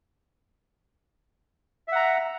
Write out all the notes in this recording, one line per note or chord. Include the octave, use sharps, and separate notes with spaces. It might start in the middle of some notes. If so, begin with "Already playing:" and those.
E5 F#5 A#5